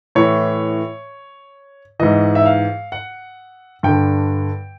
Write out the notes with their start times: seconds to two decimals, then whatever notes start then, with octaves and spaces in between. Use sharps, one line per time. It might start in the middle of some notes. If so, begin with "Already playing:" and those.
0.15 A2 E3 C#5
2.00 G#2 E3 D#5
2.35 E5
2.46 F5
2.92 F#5
3.83 G2 D3 G5